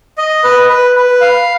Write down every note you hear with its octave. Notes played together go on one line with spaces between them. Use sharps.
D#5
B4
B4
B4
F5